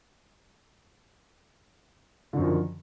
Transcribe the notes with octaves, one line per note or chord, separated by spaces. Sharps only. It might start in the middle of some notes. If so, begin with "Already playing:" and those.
F#2 D3 D#3 F3